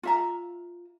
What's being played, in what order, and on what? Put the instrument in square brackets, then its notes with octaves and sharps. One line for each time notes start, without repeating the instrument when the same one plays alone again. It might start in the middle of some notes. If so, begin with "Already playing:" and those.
[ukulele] F4 E5 A#5